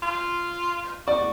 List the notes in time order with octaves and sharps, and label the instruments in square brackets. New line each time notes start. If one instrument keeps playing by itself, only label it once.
[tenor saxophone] F4
[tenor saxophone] F#4 [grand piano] D5